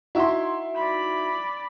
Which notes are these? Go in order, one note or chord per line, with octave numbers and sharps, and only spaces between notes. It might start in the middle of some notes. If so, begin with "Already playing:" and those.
D#4 E4 F#4 E5 C6
D5 B5